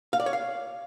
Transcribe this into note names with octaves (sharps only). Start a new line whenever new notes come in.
F5
D5
C#5
F5